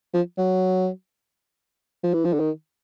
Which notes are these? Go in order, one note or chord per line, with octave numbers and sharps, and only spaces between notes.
F3
F#3
F3
E3
F3
D3
D#3